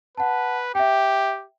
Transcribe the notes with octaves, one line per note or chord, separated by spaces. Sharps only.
B4 F#5 A5
G4 E5 G5